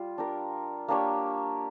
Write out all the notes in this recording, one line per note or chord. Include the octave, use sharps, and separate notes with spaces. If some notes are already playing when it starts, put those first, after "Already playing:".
Already playing: G3 F4
D4 G4 A#4
A#3 D4 G4 C#5